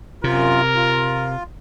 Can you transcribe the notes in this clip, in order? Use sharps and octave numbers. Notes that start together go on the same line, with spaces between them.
F#2 C3 F4 A#4
F4